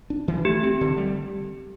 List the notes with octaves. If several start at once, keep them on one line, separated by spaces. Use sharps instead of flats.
D4
E3
A3 G4
C4
D3
G3